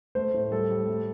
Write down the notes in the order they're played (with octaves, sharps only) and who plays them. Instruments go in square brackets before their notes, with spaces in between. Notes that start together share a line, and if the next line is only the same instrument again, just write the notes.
[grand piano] A3 C5
A2
G3 A4
G3
A3